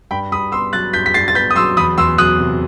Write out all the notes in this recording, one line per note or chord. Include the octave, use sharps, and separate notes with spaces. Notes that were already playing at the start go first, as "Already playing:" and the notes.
G2 G5 B5
G2 B5 D#6
B3 C6 E6
F#3 F#6 A6
G2 G6 B6
B6
G2 A6 C7
A6
B3 G6 B6
D#6
F#3 C6 E6
E2 B5 D#6
E2 C6 E6
F#3 D#6 F#6
C3